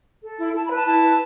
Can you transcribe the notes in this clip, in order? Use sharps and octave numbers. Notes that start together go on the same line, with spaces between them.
A4
E4
E4 A5
B5
B4
A5
E4 A5
B4